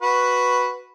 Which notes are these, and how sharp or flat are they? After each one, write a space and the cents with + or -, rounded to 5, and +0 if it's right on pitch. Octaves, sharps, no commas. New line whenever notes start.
F#4 +0 B4 +0